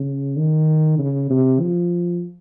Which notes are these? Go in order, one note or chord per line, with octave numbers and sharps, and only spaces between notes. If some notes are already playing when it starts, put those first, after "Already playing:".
Already playing: C#3
D#3
C#3
C3
F3